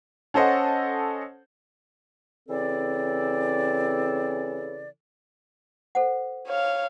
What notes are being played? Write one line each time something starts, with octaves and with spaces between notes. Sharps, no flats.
C#4 A4 C5 D#5 F#5
C#3 E3 C4 A4 D5
A4 C5 F#5
C#5 F5